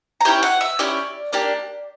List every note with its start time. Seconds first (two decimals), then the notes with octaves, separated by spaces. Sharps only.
0.21 A#5
0.25 C#4 E4 G4 G5
0.43 F#5
0.61 E5
0.79 C#4 E4 G4 D5
1.33 A#3 D4 G4